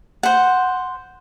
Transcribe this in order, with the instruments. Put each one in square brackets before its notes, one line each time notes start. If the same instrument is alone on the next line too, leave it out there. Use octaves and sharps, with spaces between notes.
[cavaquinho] C5 F#5